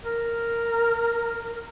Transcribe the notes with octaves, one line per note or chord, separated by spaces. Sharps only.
A#4